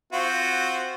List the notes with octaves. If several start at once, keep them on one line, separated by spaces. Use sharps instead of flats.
C4 F4 F#4